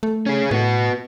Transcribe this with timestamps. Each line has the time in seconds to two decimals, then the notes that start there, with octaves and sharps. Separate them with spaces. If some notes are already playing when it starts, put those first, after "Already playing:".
0.03 A3
0.26 C#4 G#4
0.51 A2 B3 F#4